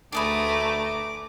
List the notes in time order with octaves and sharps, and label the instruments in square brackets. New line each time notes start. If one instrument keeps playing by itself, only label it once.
[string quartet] D2 A3 A#5 [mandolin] D4 G#4 B4 [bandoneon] D6